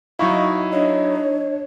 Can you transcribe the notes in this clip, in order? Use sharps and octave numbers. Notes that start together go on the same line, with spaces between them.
F#3 D#4 E4 D#5 F5 C#6
D4 C#5 D#5